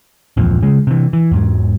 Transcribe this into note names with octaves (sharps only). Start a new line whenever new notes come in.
D1 A1 F2 A#2
C#3 G#3
C3 E3
E3
E2 G#2 F#3